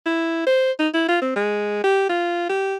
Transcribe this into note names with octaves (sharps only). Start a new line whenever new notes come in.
E4
C5
D#4
E4
F4
C4
G#3
G4
F4
G4